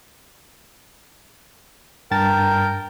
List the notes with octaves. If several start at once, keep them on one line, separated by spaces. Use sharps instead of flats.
G2 A#4 G5 A5 A6